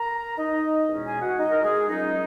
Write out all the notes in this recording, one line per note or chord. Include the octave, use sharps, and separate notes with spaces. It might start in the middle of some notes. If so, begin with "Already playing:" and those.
Already playing: A#4 A#5
D#4 D#5
E2 B2 G#3 C#4
G#4 G#5
F#4 F#5
D#4 D#5
A#4
G#3 G#4
A#2 F#3 C#4 D#4